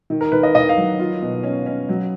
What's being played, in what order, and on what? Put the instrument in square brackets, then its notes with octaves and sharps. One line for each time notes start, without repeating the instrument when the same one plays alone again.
[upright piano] D#3
[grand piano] A#4
[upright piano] D#3 [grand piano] B4
[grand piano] D#5
[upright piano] D#3 [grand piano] D#5
[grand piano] F5
[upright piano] F#3
F4
B2
C#4
C#4
F#3